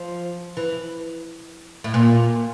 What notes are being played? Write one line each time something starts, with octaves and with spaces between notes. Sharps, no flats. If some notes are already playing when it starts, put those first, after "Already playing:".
Already playing: F3
E3
A2
A#2